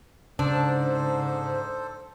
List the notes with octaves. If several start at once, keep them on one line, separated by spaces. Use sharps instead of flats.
G#2 C#3 D4 A4 C5